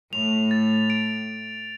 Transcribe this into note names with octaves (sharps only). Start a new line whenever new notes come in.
A2 F7
A6
D7